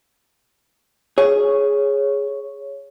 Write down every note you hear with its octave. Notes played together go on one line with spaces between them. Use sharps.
G#4 C#5